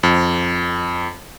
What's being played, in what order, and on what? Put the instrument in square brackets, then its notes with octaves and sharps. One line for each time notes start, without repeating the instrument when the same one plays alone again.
[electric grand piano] F2